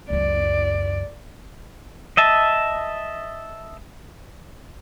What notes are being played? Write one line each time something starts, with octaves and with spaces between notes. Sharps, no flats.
C#2 F#2 D5
D#5 E5 A5